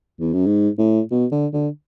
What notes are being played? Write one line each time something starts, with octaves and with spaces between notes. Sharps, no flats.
E2
F#2
G#2
A2
B2
D3
D3